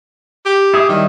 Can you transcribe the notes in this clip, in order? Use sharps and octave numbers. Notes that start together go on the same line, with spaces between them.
G4
E4 G#4 D#6
D#3 F#3 G3 E4